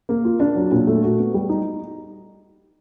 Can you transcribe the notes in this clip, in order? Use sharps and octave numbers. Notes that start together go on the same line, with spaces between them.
A#3
F4
D4
F#3
A#2
A3
F#4
B3
G3
D#4